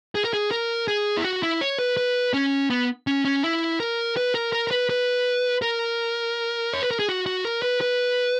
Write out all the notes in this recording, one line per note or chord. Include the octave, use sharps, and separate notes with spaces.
G#4
A#4
G#4
A#4
G#4
E4
F#4
E4
C#5
B4
B4
C#4
B3
C#4
C#4
E4
A#4
B4
A#4
A#4
A#4
B4
B4
A#4
C#5
B4
A#4
G#4
F#4
F#4
A#4
B4
B4